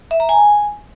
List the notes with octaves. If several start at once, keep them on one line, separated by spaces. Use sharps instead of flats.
E5
A#5
G#5